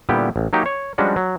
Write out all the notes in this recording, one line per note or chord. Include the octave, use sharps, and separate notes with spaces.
A#2 D3 G3 B3 E4 G4
A1
F#3 A#3 D#4 G4 C#5
C#5
F3 G3 G#3 C#4 D4 F#4
F#3